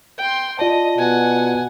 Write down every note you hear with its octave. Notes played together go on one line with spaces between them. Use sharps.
G5 C6
F4 D5 D#5 A5
B2 F#5 G#5